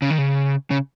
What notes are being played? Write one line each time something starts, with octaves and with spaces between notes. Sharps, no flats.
C#3
D#3
C#3
C#3